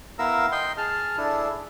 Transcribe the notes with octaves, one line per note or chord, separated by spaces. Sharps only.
B3 E4 A#4 F5 A#5 E6
D#5 G5 C6
G#4 A5 F6
D4 E4 G#4 A4